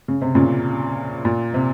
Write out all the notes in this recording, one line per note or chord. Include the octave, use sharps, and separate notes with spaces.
C#3
C3
A#2 C#3
A#2
C3